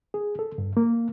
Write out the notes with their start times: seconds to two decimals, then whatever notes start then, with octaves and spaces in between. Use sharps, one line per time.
0.14 G#4
0.39 A4
0.58 G2
0.77 A#3